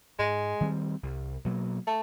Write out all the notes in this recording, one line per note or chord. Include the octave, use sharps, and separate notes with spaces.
G#2 G#3
D#3 G3 C4
C2
B2 F#3 A#3
A3